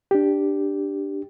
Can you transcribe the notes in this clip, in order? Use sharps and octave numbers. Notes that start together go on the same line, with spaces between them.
D4 G4